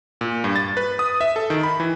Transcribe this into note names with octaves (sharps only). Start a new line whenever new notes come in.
A#2
G2
A6
B4
D#6
E5
A4
D#3
B5
E3